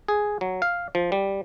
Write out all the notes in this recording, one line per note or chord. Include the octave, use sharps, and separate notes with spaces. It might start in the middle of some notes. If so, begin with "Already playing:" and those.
G#4
F#3
F5
F3
G3